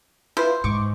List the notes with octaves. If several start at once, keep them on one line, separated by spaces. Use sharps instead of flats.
E4 F4 B4 C5
G#2 C#6 D6